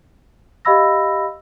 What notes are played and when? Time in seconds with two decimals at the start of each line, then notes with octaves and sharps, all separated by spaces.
0.65 G4 D#5 F5 B5 E6 A#6